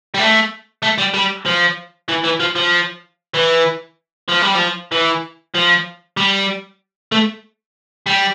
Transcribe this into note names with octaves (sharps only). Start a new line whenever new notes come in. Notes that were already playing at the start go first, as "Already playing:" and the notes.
G3
A3
A3
G3
G3
F3
E3
E3
F3
F3
E3
F3
G3
F3
E3
F3
G3
A3
G3